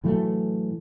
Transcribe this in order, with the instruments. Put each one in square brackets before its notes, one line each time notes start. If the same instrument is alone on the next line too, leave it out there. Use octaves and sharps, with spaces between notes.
[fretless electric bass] A2 E3 F#3 A3